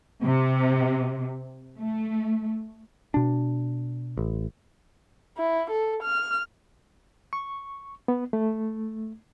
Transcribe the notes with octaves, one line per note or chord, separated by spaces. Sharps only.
C3
A3
B2 D4
A1
E4
A4
F6
C#6
B3
A3